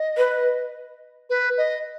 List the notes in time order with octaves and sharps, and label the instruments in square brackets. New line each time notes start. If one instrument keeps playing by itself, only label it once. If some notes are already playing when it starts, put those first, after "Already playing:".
Already playing: [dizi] D#5
[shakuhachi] B4
[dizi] B4
D#5